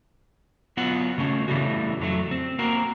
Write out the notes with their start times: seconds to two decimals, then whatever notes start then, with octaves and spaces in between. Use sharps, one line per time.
0.77 F#3 B3 F4 F#5
1.18 C#3 A3 C#4
1.48 A2 C#3 E3 G3 A3 F#4
1.99 F2 F#3 A3
2.31 C4
2.58 A#3 C4 F#4 A#4